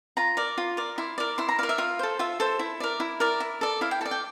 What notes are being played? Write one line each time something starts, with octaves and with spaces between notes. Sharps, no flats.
F4 A#5
A#4 D5
F4
A#4 D5
E4 C6
A#4 D5
E4 C6
A#5
A#4 D5 F5
E5
F4 F5
A4 C5
F4 E5
A4 C5
E4
A#4 D5
E4
A#4 D5
E4
A4 D5
E4 F5
G5
A4 D5 A5
G5